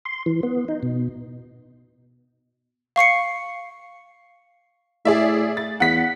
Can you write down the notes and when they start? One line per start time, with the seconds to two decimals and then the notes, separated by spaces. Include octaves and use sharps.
0.05 C6
0.26 E3
0.43 B3
0.68 D#4
0.83 B2
2.96 F5 C#6 C7 C#7
5.05 A2 G#4 D5 E5
5.57 A6
5.80 E2 F#5 B6